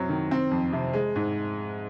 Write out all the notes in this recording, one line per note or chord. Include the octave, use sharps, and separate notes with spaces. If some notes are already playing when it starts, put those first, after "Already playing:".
Already playing: F#2 F#3 C4
D#3
C4
F2
C3
G#3
G#2